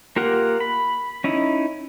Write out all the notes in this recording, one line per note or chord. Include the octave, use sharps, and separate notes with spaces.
A#3 F4 G4 A#4 F#5
B5
C#4 D#4 E4